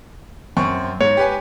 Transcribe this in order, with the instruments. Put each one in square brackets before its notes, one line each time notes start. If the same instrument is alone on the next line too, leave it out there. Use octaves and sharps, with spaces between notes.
[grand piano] F#2 C4 C#6
[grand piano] G#2 [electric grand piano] C#5
[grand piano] G4 B4 G#5